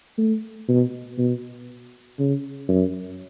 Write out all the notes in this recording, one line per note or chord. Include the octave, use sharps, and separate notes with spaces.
A3
B2
B2
C#3
F#2